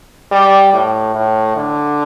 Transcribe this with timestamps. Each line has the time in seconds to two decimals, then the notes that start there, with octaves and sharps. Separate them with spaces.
0.32 G3
0.73 A2
1.15 A2
1.56 D3